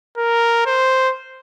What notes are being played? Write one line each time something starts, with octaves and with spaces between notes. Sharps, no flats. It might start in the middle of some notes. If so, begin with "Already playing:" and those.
A#4
C5